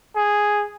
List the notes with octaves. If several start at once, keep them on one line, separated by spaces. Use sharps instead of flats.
G#4